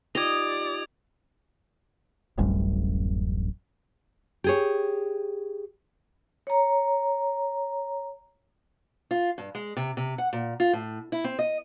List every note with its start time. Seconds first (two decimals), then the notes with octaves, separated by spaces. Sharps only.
0.15 D#4 F4 G4 D5 D#5 G#6 F7
2.38 D1 A1 F#2 G3
4.44 G4 G#4 C#5
6.47 C#5 A#5
9.11 F4
9.38 G2
9.55 G#3
9.77 C3
9.97 C3
10.18 F#5
10.33 A#2
10.60 F4
10.73 A2
11.12 E4
11.24 C4
11.39 D#5